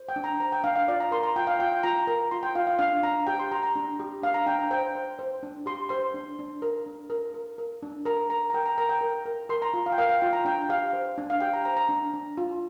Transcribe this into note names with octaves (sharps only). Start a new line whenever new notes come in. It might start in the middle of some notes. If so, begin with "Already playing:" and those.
Already playing: C5
G5
D4
A#5
C5 A#5
G5
D4 F5
F5
F4 D5
A#5
A#4 C6
A#5
F4 G5
F5
F4 G5
G5
F4 A#5
A#4 A#5
F4 C6
G5
F4 F5
F5
D4 F5
D4 A#5
G4 G5
C6
G4 A#5
A#5
D4
G4
D4 F5
A#5
D4 G5
A#5
C5 G5
C5
C5
D4
G4 C6
C5 C6
D4
D4
A#4
D4
A#4
A#4
A#4
D4
A#4 A#5
A#4 A#5
A#5
A#4 G5
A#5
A#4 A#5
G5
A#4
A#4
A#4 C6
A#5
F4
F5
G5
A#4 F5
F5
F4 G5
A#5
D4 G5
G5
G4 F5
C5
D4
F5
G4 G5
A#5
C5 A#5
A#5
D4
D4
F4